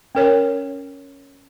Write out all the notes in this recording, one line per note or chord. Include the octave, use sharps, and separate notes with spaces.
C#4 A#4 C#5